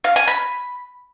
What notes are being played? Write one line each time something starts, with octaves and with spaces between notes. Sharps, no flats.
F5
G#5
B5